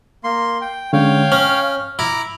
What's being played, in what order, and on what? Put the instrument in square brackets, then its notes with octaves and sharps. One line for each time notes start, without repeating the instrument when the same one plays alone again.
[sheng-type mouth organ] A#3 C6
G5
[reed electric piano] D3 G#3 C#4 [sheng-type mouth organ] C#5 F5 G5
[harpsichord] C#4 [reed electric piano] F6
[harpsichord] E4 [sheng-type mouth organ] A#5 D6